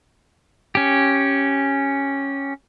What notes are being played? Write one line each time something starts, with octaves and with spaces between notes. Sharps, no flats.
C#4 G4